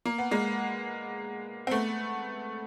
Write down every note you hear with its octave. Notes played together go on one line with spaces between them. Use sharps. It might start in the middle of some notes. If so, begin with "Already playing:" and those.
A#3
B3
G#3 A#3
C4
A3 B3